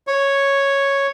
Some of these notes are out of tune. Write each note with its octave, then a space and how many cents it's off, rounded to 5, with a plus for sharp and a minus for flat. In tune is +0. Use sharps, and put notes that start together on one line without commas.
C#5 -5